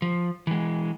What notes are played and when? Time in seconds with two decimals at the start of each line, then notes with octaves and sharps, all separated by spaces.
0.02 F3
0.47 E3 G#3